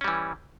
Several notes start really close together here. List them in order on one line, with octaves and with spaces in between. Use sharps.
C#4 G3 E3